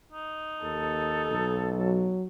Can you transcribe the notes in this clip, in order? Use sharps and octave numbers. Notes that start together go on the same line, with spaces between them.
D#4
D#2 A4
B1
F#3